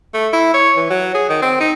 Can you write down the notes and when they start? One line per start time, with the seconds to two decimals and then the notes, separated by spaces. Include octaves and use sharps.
0.14 A3
0.33 E4
0.54 C#5
0.77 E3
0.90 F#3
1.15 G#4
1.29 D#3
1.42 C4
1.60 D#4